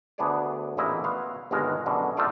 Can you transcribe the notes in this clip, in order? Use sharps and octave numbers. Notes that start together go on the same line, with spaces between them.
D2 B3 D4 G#4 C#5 D5
A1 E2 A#2 E4 D#5
B3 F#4 B4 F5
G1 D#2 B2 G#3 A#4
F#2 B2 D3
A3 C4 D#4 F4 A4 D5